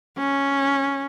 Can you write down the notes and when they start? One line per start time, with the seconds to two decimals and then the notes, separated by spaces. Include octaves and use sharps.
0.17 C#4